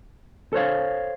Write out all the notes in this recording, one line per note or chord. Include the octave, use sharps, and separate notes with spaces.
A4 C5 C#5 F5